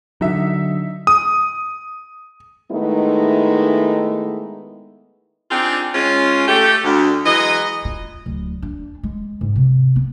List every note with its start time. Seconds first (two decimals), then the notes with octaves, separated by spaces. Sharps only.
0.21 D3 F#3 D#4 E5
1.07 D#6
2.72 D#3 G#3 A3 B3 D#4 E4
5.51 C4 D4 D#4 F4 G4 G#4
5.95 G#3 C#4 F4
6.47 A3 G4
6.84 D2
7.26 E3 F#3 G#3 D#5
7.85 F4
8.26 D1
8.62 D4
9.03 G#3
9.41 G#2
9.56 C3
9.96 B3